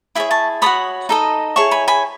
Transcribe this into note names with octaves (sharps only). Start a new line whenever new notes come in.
E4 G#4 C#5 E5
A5 C#6
F#4 A4 C#5 B5 D#6
D#4 A4 D#5
E4 G#4 C#5 A5 C#6
G#5 B5
G#5 B5